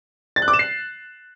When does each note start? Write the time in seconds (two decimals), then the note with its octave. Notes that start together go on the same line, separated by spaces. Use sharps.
0.36 A6
0.42 F#6
0.48 D6
0.54 E7
0.59 C7